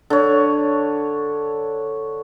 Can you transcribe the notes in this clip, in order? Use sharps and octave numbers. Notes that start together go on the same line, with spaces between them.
D3 C#5